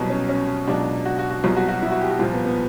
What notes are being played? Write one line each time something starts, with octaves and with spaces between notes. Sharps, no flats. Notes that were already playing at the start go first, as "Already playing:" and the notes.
Already playing: C2 B2 F#3
C#4
C#4
C#2 B2 F#3 D4
F#4
F#4
F#4
C2 B2 F#3 F4
F#4
F#4
E4
F#4
G4
F#4
C2 A#2 F3 F4
B3
B3